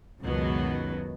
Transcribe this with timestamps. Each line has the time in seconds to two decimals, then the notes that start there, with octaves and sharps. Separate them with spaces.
0.23 C#2 F#2 B2 D#3 F#3 B3